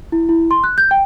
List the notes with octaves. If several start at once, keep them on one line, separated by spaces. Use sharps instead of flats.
E4
E4
C6
F#6
G6
G5